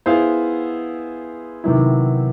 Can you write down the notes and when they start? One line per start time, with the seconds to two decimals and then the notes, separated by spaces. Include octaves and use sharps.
0.06 B3 E4 G#4 C5 F5
1.64 C3 D#3 F#3 B3 E4